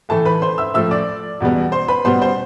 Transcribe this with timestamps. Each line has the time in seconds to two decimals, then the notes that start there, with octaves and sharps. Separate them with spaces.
0.09 A2 E3 A3 A4 A5
0.25 B4 B5
0.42 C5 C6
0.58 E5 E6
0.74 A2 F3 A3 E5 E6
0.91 D5 D6
1.40 E2 B2 G3 B3
1.72 C5 C6
1.88 B4 B5
2.05 B2 G3 B3 C5 C6
2.22 C5 C6